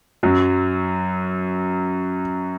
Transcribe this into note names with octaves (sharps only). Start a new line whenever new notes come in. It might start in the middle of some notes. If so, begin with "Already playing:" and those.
F#2 F#3